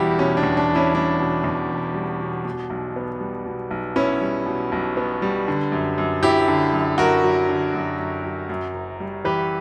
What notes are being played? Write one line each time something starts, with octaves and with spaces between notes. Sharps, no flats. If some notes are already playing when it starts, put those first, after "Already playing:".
Already playing: E1 E2 G3 E4 F#4 G4
B2 C#4
D4
E2
D4
E1
C#4 E4
G3 D4
B2
E2
E1
G3
B2
B2
B1
B3
G3
B2
B1
B3 C#4 E4
G3
B2
B1
B3
G3
D3
F#2
F#2
F#3 E4 G4
D3
F#2
F#2 F#4 A#4
F#3
D3
F#2
F#2
F#3
F#2
F#1
G3
E3 G4 B4